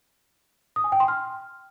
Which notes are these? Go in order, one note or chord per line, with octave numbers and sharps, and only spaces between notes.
D#6
G#5
G5
C6
F6